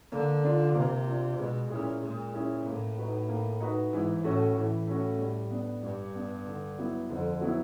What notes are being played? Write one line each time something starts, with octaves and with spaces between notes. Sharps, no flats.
D3 A#3
D4 F4
C3 A#3
D4 F4
B2 G#3
A#2 C#4 E4 G#4
A#2 G#3
C#4 E4 G#4
A2 A#3
D#4 F#4 B4
A#3
D#4 F#4 B4
G#2 E3
A2 A3 C#4 F#4
A2 E3
A3 C#4 F#4
G3
B3 D4
G2 G3
B3 D4
D3
F#3 B3 E4
F2 D3
F#3 B3 E4